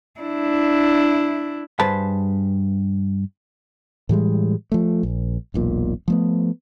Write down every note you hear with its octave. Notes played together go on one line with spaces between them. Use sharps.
D4 E4
G2 G#4 B4 C5 A5 B5
A2 E3 G3 G#3
F3 A3
A#1
E1 B1 A#2
F3 A3 B3